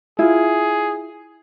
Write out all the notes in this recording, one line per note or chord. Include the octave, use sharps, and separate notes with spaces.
E4 F4 G#4